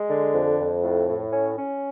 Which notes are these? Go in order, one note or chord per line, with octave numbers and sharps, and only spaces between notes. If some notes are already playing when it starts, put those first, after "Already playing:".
Already playing: G#3
D3
F2
F2
A2
A2
C#4
C#4